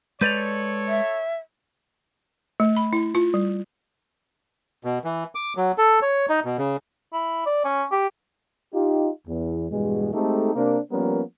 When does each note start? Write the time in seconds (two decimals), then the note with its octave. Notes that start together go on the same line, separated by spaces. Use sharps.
0.21 G#3 A4 B4 C#5 D5 G6 A6 F7
0.88 E5
2.60 A3
2.77 B5
2.93 E4
3.15 F4
3.34 G3
4.84 B2
5.04 E3
5.35 D6
5.57 F#3
5.78 A4
6.02 C#5
6.29 D#4
6.45 B2
6.58 C#3
7.13 E4
7.46 D5
7.64 C#4
7.92 G4
8.74 D#4 F4 G4
9.28 E2
9.71 E2 G2 B2 G#3
10.13 G#3 A3 C4 D#4 G4 A4
10.55 C3 A#3 C4 D4 A#4 C5
10.92 F3 G3 A#3 B3 C#4 A#4